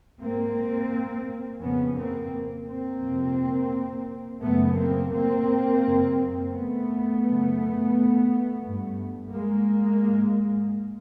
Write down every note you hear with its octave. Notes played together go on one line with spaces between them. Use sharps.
G#2 A#3 C4
F2 C#3 B3 C#4
A#3 C4
A#3 C4
F2 C3
F#2 C#3 A3 B3
A#3 C4
A#3 C4
F#2 C#3
A3 B3
F#2 C#3
G2
G#3 A#3
G#2